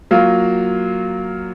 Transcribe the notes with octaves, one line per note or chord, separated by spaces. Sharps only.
F#3 A#3 F4